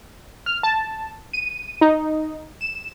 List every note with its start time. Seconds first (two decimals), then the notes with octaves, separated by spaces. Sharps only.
0.46 F6
0.63 A5
1.33 D#7
1.81 D#4
2.61 E7